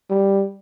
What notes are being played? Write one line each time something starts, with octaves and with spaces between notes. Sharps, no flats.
G3